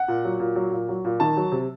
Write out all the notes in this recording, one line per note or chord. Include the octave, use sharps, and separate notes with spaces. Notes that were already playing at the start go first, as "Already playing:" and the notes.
Already playing: F#5
A#2
F#3
A#2
F#3
A#2
F#3
A#2
D#3 A5
F#3
C3